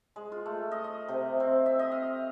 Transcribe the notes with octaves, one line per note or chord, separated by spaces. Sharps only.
G#3
F4
A3
D#5
D#5
C3
C4
E5
D#5
F5